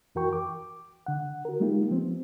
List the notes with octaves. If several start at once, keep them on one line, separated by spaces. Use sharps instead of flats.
F2 E3 F#4 A#4 G5 C#6
D6
D3 F#5
F#4 A#4
G3 G#3 A#3 D#4 F4 G4
F3 B3 C4